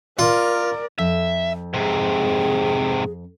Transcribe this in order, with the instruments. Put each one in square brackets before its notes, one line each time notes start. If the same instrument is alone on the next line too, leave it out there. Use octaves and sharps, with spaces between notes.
[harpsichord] F4 [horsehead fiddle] A#4 D5
[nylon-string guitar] F2 [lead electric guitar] E5
[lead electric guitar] G#2 C3 [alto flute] G#4